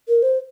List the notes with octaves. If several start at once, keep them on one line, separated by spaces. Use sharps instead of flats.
A#4
C5